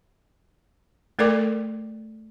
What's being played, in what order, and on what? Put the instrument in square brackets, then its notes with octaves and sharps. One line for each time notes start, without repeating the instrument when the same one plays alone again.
[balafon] A3 A4 A#4 D5 G5 D6